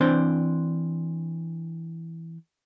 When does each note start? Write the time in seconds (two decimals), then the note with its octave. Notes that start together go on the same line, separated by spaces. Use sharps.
0.01 E3 C4 D4 C5